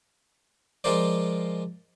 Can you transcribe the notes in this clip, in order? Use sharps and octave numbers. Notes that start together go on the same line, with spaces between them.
F3 G#3 F4 A#4 C5 D5